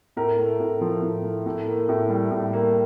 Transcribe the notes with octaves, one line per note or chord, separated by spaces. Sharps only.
A2 A#4
A3
A2
F3
A2
A3
A2
A#3
A2
G3
A2
A#3